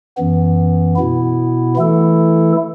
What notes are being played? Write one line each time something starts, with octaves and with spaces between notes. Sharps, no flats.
F#2 E3 B3
B2 B3 E4
E3 A3 E4 A4